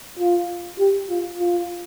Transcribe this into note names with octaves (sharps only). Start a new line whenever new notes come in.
F4
G4
F4
F4